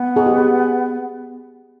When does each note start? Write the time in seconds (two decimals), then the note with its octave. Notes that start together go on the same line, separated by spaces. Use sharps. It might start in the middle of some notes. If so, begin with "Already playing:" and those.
Already playing: B3
0.16 G#4
0.26 G4
0.38 G#4